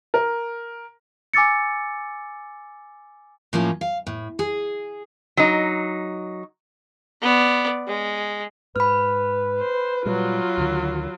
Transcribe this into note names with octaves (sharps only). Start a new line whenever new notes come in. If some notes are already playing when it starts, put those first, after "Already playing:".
A#4
G#5 D6 E6 A6 C#7
A2 F3 A#3 C#4
F5
A2
G#4
F#3 D#4
B3 D5
G#3
G#2 B4 B5 F6
C5
A#2 F#3 G3 F4
D2 D3 D#3